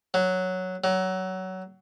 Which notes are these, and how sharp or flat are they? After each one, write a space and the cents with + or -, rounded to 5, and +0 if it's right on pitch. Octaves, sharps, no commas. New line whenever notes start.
F#3 +0
F#3 +20